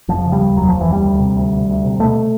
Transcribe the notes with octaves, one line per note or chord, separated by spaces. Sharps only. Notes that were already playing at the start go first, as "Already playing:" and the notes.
F1 F3
C#3
G3
D#2
F1 F#3
F1 F3
E3
D#2 G3
D2
C3
D2
D2
D2
C3
B2 A3